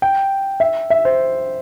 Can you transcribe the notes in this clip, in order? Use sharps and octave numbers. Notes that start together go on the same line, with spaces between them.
G5
E5
E5
C5